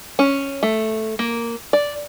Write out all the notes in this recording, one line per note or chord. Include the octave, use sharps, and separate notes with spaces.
C#4
A3
A#3
D5